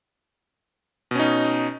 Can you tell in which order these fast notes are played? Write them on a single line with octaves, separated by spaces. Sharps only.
B2 C#4 D#4